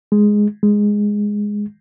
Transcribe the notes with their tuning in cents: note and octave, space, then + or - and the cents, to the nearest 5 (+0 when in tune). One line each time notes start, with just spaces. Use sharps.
G#3 +0
G#3 -5